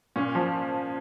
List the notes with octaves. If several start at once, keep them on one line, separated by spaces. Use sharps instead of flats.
A#2 C#4
F3